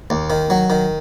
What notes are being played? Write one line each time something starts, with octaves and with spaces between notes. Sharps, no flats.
D#2
D#3
F#3
D#3